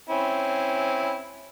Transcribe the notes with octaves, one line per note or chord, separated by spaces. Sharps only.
C4 C#4 E4